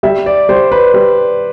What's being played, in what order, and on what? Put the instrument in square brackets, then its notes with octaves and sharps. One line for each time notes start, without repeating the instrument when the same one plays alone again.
[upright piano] G3 [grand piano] E5
[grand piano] D5
[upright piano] G3 [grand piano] C5
[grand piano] B4
[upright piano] G3